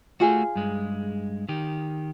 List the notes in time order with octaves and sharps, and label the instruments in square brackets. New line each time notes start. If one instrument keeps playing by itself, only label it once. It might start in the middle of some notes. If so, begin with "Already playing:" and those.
[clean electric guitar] A3 F#4 [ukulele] F4 G#4
[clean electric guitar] G2 G#3
D#3 G4